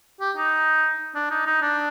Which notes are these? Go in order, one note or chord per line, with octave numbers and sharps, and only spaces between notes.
G4
D#4
D4
D#4
D#4
D4